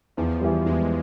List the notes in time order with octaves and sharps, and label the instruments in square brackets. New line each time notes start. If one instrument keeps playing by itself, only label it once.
[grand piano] E2 [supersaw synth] F3
[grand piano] E3 G3
[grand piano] E2 [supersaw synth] G#3